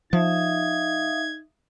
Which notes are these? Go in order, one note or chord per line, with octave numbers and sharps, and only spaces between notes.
F3 D#4 E5 F5 D#6 G#6